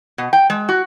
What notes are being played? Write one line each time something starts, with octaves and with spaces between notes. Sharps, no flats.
B2
G5
G#3
F#4